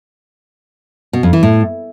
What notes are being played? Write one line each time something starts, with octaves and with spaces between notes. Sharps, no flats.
B2
F2
E3
A2